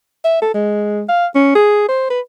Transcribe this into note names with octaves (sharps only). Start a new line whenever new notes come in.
E5
A4
G#3
F5
C#4
G#4
C5
B4